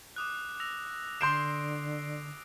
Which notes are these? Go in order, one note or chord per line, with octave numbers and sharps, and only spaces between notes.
D6 D#6 F#6
E6 A#6 F7
D3 C6 G6 C7 D7 E7